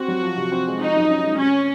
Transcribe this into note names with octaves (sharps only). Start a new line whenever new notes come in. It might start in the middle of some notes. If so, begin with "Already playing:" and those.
Already playing: C4 F#4
F#3
F3
C3
C4
G#3
F3 D#4
F#2
C#4
G#3
C3 C#4